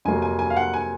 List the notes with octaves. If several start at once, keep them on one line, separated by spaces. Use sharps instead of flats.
F2 C3 F#3 A#3 G#5
G#5
G#5
F5
F#5
G#5